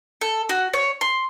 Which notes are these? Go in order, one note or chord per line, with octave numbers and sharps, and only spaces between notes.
A4
F#4
C#5
C6